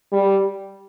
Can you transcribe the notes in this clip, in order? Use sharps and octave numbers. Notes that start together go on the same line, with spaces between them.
G3